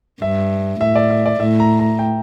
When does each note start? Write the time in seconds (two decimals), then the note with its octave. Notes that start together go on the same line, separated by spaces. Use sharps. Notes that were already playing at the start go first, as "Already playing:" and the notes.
0.22 G2 E5
0.80 A2 E5
0.95 D5
1.10 E5
1.26 D5
1.40 A2 E5
1.60 A#5
1.79 A#5
1.99 G5